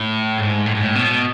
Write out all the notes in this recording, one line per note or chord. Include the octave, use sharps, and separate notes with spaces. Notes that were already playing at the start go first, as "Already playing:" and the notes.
Already playing: A2
G#2
A2
G#2
A2
B2